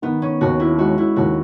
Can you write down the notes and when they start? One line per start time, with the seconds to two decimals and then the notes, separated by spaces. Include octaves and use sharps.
0.02 D#3 B3
0.22 C#4
0.41 D#2 F#4
0.60 E4
0.78 G#3 F#4
0.98 E4
1.16 D#2 F#4